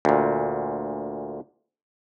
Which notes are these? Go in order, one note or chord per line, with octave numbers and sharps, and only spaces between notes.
D2 A#2